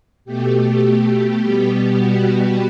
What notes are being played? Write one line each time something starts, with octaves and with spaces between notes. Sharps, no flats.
B2 A3 G4
B2 G3 B3 G4
F#4